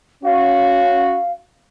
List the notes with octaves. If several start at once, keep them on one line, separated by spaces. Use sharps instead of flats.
C#4 F#4 F5